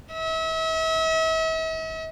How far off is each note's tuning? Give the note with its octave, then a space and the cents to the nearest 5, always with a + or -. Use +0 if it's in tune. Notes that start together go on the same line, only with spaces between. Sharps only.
E5 -40